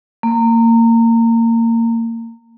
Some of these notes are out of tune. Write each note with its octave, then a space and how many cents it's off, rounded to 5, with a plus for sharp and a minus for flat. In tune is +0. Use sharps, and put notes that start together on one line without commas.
A#3 -25